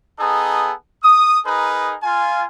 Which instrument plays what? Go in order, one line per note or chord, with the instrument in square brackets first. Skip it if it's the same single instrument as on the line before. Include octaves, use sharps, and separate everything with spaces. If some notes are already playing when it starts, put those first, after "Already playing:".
[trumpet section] B3 D#4 G#4 A4
D#6
D#4 G#4 A#4 B4
F4 G#5